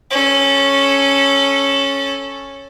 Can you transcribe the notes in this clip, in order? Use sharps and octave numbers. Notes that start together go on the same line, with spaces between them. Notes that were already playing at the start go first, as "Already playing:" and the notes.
C#4 A4